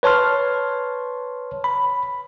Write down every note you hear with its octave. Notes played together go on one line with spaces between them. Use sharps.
B4 C#5 A5 C6 F6
B5